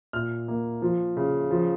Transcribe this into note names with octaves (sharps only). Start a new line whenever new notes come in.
A#2 F6
A#3
F3
C#3
F3